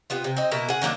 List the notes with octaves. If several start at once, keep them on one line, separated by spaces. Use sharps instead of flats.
C3 B3 F4
C3
C4 D#4
B2 A#3 E4 A#5
G#4 F#5
D#3 F#3 A#3 D4